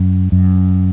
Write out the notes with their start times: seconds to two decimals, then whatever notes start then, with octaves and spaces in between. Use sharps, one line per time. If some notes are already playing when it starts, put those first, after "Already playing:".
Already playing: F#2
0.32 F#2